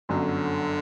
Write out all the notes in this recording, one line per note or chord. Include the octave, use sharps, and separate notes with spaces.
G1 F#2 D3 F#3